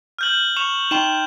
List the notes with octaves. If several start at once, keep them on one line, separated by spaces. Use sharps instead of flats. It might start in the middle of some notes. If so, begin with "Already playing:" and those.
F6 G6 F#7
C#6 E7 F7
D#4 G5 C6 E7